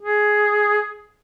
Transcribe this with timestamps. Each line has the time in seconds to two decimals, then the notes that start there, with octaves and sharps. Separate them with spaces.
0.01 G#4